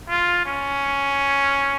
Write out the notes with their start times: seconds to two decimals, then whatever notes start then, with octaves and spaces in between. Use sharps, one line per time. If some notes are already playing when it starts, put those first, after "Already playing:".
0.09 F4
0.45 C#4